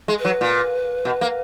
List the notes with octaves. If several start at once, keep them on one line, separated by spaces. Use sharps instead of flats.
G#3
B4
F#3
A#2
B2
A#3